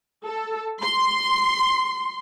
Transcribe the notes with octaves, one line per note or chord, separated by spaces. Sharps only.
A4
C6